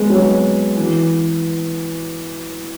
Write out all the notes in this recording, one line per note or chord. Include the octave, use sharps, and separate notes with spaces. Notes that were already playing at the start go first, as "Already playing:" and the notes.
Already playing: G#3 B3
F#3
E3